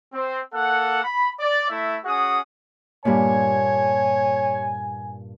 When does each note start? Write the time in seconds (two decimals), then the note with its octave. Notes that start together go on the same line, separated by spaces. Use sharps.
0.14 C4
0.54 A#3 A4 F#5
1.03 B5
1.39 D5
1.69 A3 E4 E5
2.05 C#4 F#4 G#4 F#5 D#6
3.05 G2 A#2 C#5 G#5